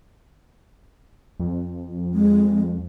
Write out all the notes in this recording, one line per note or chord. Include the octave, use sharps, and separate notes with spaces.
F2
G#3